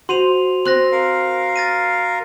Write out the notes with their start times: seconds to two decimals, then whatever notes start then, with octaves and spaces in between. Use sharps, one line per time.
0.09 F#4 C5 C6 D#7 F7
0.65 C4 C6 F#6 A#6
0.92 A#4 F5
1.56 A6 A#6 D#7